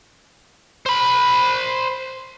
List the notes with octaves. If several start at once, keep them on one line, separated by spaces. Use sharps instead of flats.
C5 B5